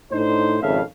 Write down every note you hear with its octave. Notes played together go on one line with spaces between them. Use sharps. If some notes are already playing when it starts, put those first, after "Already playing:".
A2 D4 D#4 C5
G#1 F2 C#3 A4 E5 F5